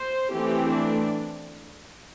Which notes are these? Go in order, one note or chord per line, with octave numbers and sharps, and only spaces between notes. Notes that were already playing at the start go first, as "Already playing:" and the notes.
Already playing: C5
E3 A3 C4 G4
D4